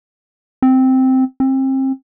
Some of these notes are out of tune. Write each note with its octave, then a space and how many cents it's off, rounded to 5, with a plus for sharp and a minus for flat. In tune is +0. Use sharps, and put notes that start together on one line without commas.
C4 -5
C4 +30